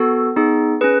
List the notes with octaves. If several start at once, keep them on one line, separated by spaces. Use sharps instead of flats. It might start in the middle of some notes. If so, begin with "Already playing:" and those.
Already playing: B3 F#4 A4
B3 D#4 G#4
C#4 G#4 B4